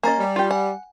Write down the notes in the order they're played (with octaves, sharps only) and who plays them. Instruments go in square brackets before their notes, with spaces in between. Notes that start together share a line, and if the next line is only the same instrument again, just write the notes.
[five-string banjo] A#3 C#4 D#5 [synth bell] G#5 A#5 A6
[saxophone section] G3
[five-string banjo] F4 G4
[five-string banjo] F#5 [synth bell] G#5